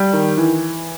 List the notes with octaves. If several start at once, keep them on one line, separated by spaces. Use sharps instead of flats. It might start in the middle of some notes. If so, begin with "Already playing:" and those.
Already playing: G3
D#3
E3